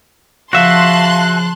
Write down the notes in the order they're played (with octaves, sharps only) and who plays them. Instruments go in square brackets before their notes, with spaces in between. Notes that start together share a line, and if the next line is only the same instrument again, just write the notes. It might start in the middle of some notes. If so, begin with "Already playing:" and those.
[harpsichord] C#3 F3 [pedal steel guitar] F#4 E5 [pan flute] F5 [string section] A5 C6 F#6